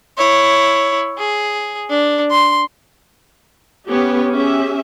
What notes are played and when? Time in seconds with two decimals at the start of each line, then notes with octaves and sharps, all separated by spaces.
0.17 E4 C#5
1.18 G#4
1.90 D4
2.31 C6
3.88 B3 C#4 G4 C#5
4.32 C#4 G4 G#4 E5